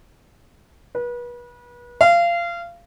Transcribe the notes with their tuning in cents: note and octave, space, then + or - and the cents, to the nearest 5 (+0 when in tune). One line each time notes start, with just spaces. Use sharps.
B4 -35
F5 -25